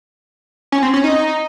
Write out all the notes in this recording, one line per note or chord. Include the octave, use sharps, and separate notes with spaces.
C#4
C4
C#4
D#4